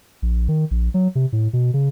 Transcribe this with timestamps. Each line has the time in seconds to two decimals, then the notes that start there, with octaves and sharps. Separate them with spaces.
0.22 A#1
0.48 D#3
0.71 A#1
0.94 F#3
1.15 C3
1.33 A2
1.53 B2
1.74 C#3